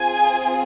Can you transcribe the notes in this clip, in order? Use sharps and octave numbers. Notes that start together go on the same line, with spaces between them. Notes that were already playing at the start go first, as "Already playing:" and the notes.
Already playing: C4 F4 G#4 G#5